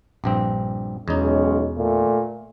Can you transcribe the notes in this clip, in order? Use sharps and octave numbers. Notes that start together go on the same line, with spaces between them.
A#1 G2 C4
B1 E2 G#3 C#4 D#4
A#2 A3